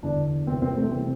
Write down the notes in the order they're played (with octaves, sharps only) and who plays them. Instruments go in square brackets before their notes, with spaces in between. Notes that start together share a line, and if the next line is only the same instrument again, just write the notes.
[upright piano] E2 D3 D4
E2 C3 E3 C4
C4
A3
C3 E3 C4